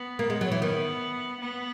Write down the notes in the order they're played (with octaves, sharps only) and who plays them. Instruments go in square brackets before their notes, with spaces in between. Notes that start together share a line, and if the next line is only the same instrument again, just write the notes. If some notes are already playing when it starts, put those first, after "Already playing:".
Already playing: [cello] B3
[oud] A#3
G#3
F#3
E3
[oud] D#3 [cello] B3
[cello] B3